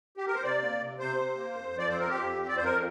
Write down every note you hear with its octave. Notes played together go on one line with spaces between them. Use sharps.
G4
A#4
C5
C3 D5
A#3
C3
C3 C5
C3
A#3
F2
F2
D5
C4 C5
A#4
F2 G4
C4
F2 D5
C5
F2 A#4